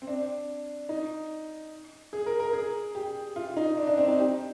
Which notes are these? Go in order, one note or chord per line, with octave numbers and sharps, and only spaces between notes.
C4
D4
D#4
G#4
A#4
A#4
G#4
G4
F4
D#4
D4
D4
C4
D#4
G4